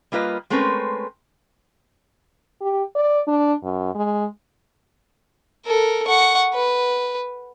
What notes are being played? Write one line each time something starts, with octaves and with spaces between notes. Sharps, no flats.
G3 A#3 F4 B4 D#5
G#3 A3 C4 C#4 A#4 B4
G4
D5
D4
F#2
G#3
A4 A#4
F#5 C#6
B4